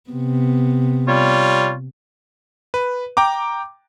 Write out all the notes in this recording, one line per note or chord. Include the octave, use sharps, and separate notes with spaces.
C3 B3
G3 F4 C#5
B4
G5 A#5 D6